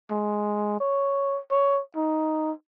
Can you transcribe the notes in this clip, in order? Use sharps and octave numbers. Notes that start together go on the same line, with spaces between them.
G#3
C#5
C#5
D#4